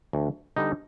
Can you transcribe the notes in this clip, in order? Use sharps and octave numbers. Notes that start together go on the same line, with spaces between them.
D2
D3 G3 B3 D#4